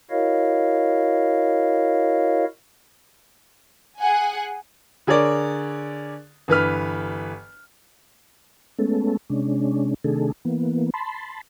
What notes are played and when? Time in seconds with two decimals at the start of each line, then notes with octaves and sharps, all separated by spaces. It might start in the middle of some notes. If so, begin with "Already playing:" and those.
0.10 E4 F#4 A#4 C#5 D#5 F5
3.98 G#4 F#5 G#5
5.07 D3 G#4 A#4 C#5 D5
6.48 G1 E3 B4 F6
8.79 G#3 A3 B3 C#4 A4
9.30 C3 G#3 C#4 D4
10.04 C3 D#3 A3 D4 G#4 A4
10.45 E3 A#3 B3
10.94 A5 B5 C6